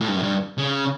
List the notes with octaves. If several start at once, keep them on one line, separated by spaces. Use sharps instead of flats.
A2
G2
F#2
G2
C#3